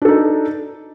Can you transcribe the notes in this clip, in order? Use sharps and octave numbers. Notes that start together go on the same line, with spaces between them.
D4 D#4 A4